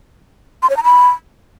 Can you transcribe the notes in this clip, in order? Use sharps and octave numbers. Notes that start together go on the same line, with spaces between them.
C6
C#5
A#5
B5